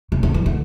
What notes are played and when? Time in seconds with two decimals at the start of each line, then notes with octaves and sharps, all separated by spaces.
0.12 C#3
0.23 D3
0.34 E3
0.46 D3